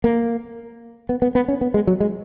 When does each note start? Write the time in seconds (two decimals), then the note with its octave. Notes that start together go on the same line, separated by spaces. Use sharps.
0.04 A#3
1.09 B3
1.22 B3
1.35 B3
1.48 C#4
1.61 B3
1.74 G#3
1.87 F#3
2.00 G#3